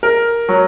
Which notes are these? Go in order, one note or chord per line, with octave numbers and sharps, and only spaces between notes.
A#4
F#3